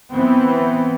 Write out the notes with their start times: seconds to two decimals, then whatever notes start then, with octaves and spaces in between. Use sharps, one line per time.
0.13 E3 B3 C4